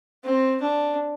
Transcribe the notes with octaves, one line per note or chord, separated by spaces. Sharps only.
C4
D4